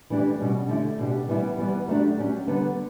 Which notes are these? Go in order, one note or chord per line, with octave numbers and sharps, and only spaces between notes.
E3 A3 D4 G4
B2 G3 C#4
D3 A3 E4 G4
B2 A3 D4 G4
E3 G3 B3 E4
E3 G3 B3
F#3 A3 D4 G4
F#3 C#4 G4
D3 G3 B3